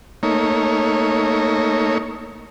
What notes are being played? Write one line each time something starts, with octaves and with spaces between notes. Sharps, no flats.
A3 A#3 D#4 C#5